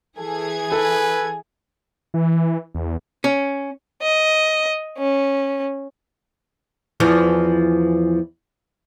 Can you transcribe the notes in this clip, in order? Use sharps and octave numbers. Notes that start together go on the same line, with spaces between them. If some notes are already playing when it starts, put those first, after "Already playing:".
E3 G#4 A4 G#6
A4 B4 G#5
E3
E2
C#4
D#5
C#4
E2 E3 F3